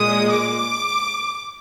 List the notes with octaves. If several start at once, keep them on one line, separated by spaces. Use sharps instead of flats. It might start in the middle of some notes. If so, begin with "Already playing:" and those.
Already playing: A#2 G#3 D#6
D6